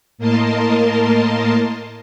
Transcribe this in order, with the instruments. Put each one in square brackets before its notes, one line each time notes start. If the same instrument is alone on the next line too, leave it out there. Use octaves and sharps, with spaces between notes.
[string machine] A2 A#3 A#4 D#5 A5 C6